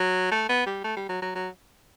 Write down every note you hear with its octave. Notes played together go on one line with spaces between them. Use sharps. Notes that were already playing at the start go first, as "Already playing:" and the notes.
Already playing: F#3
A3
B3
G3
A3
G3
F#3
F#3
F#3